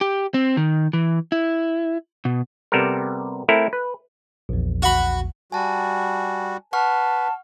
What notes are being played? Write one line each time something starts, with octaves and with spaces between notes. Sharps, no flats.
G4
C4
D#3
E3
E4
B2
C3 G3 B3 C4 A4 A#4
A3 C4 E4 A4 A#4
B4
A#1 E2
F#4 B5
G3 F#4 G#5 A5
B4 F#5 A5 C#6 F6